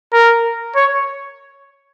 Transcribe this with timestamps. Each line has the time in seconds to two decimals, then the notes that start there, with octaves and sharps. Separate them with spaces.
0.13 A#4
0.76 C#5